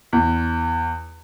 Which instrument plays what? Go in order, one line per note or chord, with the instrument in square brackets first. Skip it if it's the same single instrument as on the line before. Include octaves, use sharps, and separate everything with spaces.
[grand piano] E2